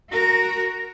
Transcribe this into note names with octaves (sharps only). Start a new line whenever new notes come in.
F#4 A#4